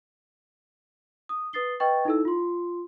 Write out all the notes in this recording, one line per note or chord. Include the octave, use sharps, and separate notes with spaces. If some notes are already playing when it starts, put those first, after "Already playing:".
D#6
B4 D#6 A6 C7 G7
B4 D#5 G5 C#6 A6
D#4 E4 A4 E6
F4 C6